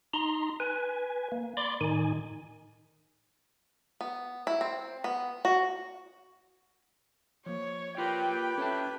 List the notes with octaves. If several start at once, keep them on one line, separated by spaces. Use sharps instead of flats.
D#4 A#5 C6
B4 G#5
A#3
D5 B5 C6 D6
A2 D#3 D#4 G#5
B3
E4
C4
B3
F#4
F3 A#3 C#5
F4 G4 A#4 B4 G5 B5
C#4 A4 C#5 E5 A5